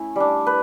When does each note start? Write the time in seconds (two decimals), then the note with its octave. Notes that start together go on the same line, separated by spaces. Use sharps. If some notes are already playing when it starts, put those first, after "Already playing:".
Already playing: A3 C#4 E4
0.16 G3 D4
0.47 B4